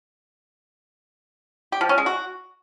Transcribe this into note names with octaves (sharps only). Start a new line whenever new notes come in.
G4
F3
C#4
G#3
F#4